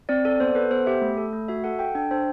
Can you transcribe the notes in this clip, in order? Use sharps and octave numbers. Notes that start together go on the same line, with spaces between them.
C4 D5
A4 D5
B3 C5
A4 B4
B3 C5
G4 E5
A3
A4
A3
F#4 E5
A4 F#5
A4 G5
D4 G5
D4 C5